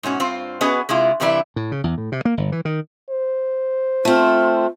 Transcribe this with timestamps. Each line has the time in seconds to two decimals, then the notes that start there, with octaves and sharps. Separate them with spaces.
0.03 G#2 B2 C#4 F#4
0.20 G2 C4 F4 C5
0.61 B3 C#4 F#4 G#4 B4 D#5
0.89 C3 G#3 E4 F4
1.20 G2 C3 E3 E4 D5
1.56 A2
1.72 C#3
1.84 E2
1.98 A2
2.12 C3
2.25 A#3
2.37 G1
2.52 E3
2.65 D#3
3.10 C5
4.05 A3 C4 F4